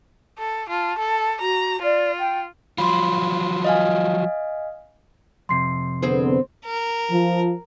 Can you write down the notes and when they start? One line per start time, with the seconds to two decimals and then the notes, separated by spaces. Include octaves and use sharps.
0.38 A4
0.69 F4 A5
0.99 A4
1.41 F#4 A#5
1.82 F4 D5
2.19 G5
2.78 F3 F#3 F4 B5 C6
3.64 D#5 F5 G#5
5.49 F2 C3 C6 C7
6.02 D3 B3 C4 G#4 C5
6.65 A#4
7.11 F3